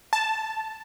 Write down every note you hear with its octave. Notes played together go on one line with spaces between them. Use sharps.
A5